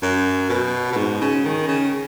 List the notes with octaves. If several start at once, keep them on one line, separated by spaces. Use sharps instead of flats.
F#2
B2
B2
G#2
C#3
D#3
C#3